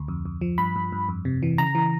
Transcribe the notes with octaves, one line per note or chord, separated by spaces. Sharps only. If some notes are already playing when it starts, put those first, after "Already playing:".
Already playing: D2
F2
F2
F3
G2 B5
G2
G2
F2
C3
E3
C#3 A#5
E3